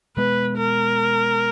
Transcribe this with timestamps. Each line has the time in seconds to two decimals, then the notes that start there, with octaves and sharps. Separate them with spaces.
0.17 B2 G#3 B3 B4
0.57 A#4